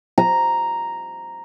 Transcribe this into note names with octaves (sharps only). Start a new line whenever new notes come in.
A#5